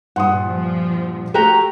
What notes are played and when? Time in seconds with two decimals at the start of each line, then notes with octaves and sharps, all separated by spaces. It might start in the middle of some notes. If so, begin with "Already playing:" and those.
0.16 G2 A#2 F#5 C6 D#6
0.46 F3
1.34 A3 F#4 G4 A#5